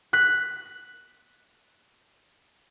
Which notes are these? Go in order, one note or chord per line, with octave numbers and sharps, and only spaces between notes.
F#6 B6